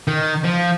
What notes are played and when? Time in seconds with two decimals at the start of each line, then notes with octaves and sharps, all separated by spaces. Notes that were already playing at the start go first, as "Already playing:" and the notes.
0.08 D#3
0.44 F3